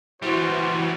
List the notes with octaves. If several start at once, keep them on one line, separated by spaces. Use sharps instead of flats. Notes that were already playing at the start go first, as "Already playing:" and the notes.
E3 F#3 G3 F#4 C5